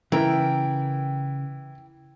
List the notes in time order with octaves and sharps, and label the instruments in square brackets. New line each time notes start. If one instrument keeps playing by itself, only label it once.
[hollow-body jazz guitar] C#3 A#4 [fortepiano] E3 E4 [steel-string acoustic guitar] G5